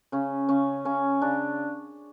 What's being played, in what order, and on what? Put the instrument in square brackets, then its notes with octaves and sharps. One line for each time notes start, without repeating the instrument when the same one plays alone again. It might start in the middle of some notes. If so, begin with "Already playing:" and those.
[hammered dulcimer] C#3 C#4
C#3 C#4
C#3 C#4
C#3 D4